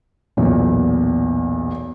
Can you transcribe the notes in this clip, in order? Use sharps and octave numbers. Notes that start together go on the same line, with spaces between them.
B1 E2 A#2